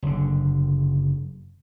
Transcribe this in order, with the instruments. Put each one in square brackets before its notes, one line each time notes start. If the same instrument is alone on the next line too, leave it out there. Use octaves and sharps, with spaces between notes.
[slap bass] F#1 D3